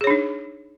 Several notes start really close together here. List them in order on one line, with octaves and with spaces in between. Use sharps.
G#4 C#5 D4 D#4